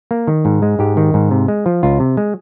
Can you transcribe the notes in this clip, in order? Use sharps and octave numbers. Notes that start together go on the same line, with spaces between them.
A#3
D#3
G#2
G#3
G#2 G4
D#3
G#2
C3
G#3
F3
C#2 F4
C3
G#3